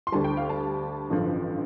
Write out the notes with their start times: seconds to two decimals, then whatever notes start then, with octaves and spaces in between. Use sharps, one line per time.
0.07 C6
0.12 D2 D3 G3 A5
0.24 G5
0.37 F5
0.49 A5
1.10 A1 G2 D3 F3